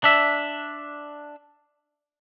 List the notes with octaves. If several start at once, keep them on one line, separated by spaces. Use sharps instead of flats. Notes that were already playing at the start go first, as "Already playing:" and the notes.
D4 E5